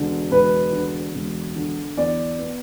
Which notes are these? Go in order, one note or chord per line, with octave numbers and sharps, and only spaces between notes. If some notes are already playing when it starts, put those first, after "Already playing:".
Already playing: E1 D3
E1 B4
D3
E1
D3
E2 D5
B3